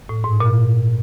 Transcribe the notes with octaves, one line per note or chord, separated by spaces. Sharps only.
A2
G#2
A#2